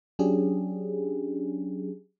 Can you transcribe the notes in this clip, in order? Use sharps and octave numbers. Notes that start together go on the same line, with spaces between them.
F#3 C#4 D4 G4 G#4